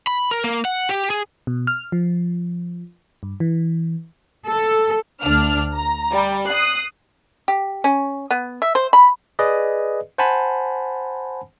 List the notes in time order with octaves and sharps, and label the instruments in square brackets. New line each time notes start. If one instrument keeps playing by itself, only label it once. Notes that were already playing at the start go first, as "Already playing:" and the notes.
[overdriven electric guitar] B5
A#4
A#3
F#5
G4
G#4
[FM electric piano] B2
F6
F3
G2
E3
[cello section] A4
[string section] D2 D4 F6
A#5
G3
D#6 F#6 C7
[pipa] G4
C#4
B3
E5
C5
B5
[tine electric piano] G#4 B4 D5 D#5
C5 F#5 G#5 A5 B5